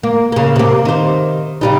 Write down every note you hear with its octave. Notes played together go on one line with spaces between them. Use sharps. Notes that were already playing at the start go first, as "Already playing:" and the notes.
A#3
C#3 A#3
C3 A#3
D#3 C5
C#3 G3 D#4